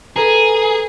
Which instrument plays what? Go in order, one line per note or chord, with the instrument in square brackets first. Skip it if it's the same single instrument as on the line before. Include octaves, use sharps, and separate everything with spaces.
[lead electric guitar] G#4 [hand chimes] A4 B4 A#5